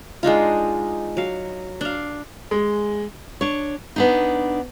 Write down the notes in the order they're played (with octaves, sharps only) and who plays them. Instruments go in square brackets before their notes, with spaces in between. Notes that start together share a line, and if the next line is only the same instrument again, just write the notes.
[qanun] G#3 D4 D#4 F4
F#3 F5
D4 F5
[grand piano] G#3
[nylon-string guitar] D4 C#5
B3 D4 D#4